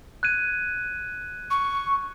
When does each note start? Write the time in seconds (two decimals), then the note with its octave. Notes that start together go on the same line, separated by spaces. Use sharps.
0.23 F#6 G#6 D#7
1.50 C#6